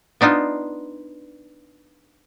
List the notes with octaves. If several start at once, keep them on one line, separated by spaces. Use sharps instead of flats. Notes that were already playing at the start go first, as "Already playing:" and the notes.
B3 D4 D#4 F4